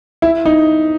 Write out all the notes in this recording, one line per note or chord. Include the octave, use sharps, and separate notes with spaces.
E4
D#4